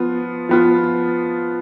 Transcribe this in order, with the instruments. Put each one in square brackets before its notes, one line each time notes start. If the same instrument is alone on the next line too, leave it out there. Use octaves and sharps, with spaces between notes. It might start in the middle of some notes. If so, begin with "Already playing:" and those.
Already playing: [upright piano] F3 B3 F4
F3 B3 F4